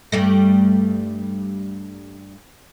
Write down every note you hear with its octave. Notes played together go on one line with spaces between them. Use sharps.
G2 G3 A3